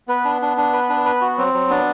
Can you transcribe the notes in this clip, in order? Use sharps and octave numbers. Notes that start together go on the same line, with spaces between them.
B3 B4
D4
D4
D4
B4
D4
B4
F#4
F#3 C4
F#3
B3 D4